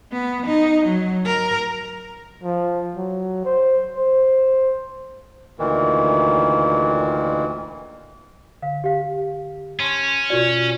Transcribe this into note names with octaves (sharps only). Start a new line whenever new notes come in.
B3
D#4
F#3
A#4
F3
F#3
C5
C5
D2 A#2 D#3 E3
D3 F5
G4 F5
C#4 A5 C6 C#6
B2 F4 F#4 D5